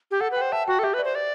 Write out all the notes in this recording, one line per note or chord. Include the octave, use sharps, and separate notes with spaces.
G4
A4 F#5
B4
G5
C5
E5 A5
F#4 G5
A4
G4 E5
B4
D5
C5
D5